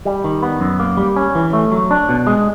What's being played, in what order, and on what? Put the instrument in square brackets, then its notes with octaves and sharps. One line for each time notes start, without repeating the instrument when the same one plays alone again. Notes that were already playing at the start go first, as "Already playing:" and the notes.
[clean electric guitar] G3
D#3
B3
F#2
A#3
G3
C#4
E3
A3
F#3
D4
B2
G#3